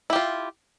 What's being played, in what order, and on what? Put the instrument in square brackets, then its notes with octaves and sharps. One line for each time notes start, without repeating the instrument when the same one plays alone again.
[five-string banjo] E4
G4
F4